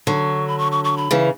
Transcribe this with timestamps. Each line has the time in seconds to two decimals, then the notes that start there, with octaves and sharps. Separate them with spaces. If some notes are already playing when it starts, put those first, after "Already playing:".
0.07 D3 F#3 C#6
0.48 B5
0.58 C#6
0.72 C#6
0.84 C#6
0.97 B5
1.11 C#3 E3